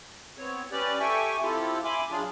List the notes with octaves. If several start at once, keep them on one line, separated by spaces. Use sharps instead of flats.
B3 C4 C#5
C#4 G4 B4 D5
G4 A4 E5 G5 G#5 C#6
C4 E4 F4 G4 A4
E5 G#5 B5 C6 D6
F#3 D4 F4 G#4